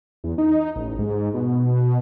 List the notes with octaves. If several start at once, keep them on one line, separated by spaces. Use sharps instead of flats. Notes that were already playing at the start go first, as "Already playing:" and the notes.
E2
D#4
A1
G#2
B2